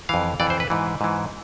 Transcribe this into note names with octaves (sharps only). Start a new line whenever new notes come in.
F2 E3 F5
F2 E3 D5
C5
B4
G#2 E3
G#2 E3